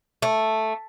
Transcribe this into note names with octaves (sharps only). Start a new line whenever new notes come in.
A3